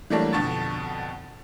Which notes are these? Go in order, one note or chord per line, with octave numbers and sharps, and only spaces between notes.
E3 F#3 G3 A3 A#3 D4
F2 B2 D3 A5 C#6 A6